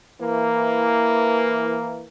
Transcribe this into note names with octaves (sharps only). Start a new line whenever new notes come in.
E3 A#3